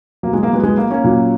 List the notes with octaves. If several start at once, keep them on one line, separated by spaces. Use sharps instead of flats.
B2 F#3 A#3
G#3
A#3
G#3 B3
G#3 B3
A#3
A#3 C#4
A#2 F#3